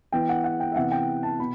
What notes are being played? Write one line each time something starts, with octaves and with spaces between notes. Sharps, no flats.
E3 B3 G5
F#5
F#5
G5
E5
C3 E3 B3 F#5
G5
A5
B2 B5